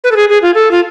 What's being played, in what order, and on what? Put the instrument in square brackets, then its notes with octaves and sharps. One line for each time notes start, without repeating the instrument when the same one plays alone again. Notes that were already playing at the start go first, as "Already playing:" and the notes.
[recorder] B4
A4
G#4
G#4
F4
A4
F4